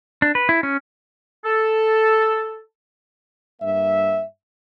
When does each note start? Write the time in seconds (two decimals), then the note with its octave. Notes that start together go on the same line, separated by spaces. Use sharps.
0.22 D4
0.35 B4
0.49 E4
0.63 C#4
1.45 A4
3.61 G2 A#3 E5